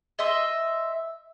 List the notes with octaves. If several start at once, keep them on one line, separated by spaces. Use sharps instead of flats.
D#5 E5 C6